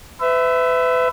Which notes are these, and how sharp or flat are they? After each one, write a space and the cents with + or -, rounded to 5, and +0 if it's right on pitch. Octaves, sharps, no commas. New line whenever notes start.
B4 +35 E5 +0